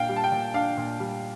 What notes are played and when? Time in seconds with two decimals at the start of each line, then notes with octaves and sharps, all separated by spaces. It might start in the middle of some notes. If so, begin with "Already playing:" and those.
Already playing: A#2 D4 F5 G5
0.09 G3
0.16 A5
0.24 G5
0.32 A#2
0.54 D4 F5
0.77 A#2
1.00 G3